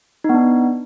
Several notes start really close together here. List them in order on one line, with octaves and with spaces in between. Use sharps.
D#4 B3 D4